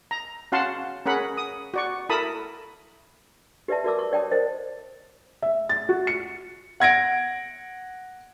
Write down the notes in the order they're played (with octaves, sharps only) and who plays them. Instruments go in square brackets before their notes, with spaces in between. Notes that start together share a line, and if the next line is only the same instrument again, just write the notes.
[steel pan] A#5
C#4 F#4 F5 F#5 A5 C6
C#4 G#4 A#4 F#5 B5
D#6
F#4 D5 C#6
E4 A4 A#4 A5 B5 D#6
[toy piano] G4 B4 D5 E5 A5
F#4 A#4 D5 A5 D6 E6
C#6
C#5 D5 G5 A5 D#6
A#4 C5 D#5
[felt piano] E5
A6
F#4
C#7
[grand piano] F#5 G#6 A#6 D7